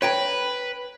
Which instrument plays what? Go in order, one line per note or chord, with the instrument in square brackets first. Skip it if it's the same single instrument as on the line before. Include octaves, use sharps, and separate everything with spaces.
[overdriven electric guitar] B4 [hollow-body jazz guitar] C#5 G5 A#5